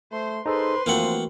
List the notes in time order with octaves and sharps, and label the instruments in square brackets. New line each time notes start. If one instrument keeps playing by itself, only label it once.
[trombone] A3 [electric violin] C5 C6
[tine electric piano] D#4 G#4 A4 [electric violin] B4 C6 [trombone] C5
[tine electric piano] E3 A3 F#4 [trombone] F3 [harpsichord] A#3 C4 F#5